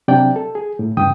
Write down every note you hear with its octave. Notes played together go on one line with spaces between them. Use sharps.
C3 F#3 D4 D5 G5
A4
G#4
A2
E2 G2 C#3 G5 D#6